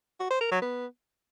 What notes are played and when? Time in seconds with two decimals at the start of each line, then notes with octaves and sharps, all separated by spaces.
0.20 F#4
0.30 C5
0.41 A#4
0.51 F#3
0.62 B3